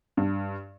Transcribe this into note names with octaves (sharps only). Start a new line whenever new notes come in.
G2